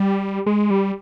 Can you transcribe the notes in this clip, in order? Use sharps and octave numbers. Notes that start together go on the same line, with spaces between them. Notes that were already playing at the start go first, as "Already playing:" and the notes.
Already playing: G3
G#3
G3